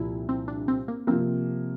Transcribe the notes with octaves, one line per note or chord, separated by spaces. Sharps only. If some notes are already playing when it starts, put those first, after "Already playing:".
Already playing: C2 A#2 F3 E4
C4
D4
C4
A#3
C3 F3 A#3 C4